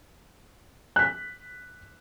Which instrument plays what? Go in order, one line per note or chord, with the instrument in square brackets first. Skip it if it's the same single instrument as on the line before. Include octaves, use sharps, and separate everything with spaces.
[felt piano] F#6 B6